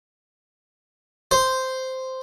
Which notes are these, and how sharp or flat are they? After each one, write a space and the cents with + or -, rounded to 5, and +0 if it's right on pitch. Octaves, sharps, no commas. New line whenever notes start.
C5 -5